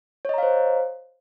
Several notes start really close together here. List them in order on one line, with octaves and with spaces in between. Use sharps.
C#5 D#5 A#5 F5 C5